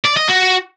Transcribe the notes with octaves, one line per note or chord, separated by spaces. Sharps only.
D5
D#5
F#4